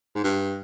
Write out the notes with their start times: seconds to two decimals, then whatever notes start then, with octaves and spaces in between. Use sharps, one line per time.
0.15 G#2
0.24 G2